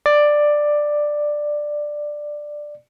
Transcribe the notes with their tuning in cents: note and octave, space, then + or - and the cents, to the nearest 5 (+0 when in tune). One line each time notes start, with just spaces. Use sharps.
D5 +10